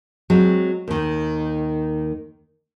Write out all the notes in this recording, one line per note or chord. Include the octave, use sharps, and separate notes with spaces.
F#3 G#3 C4
D#2 D#3